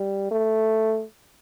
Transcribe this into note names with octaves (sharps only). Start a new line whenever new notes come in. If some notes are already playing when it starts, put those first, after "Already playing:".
Already playing: G3
A3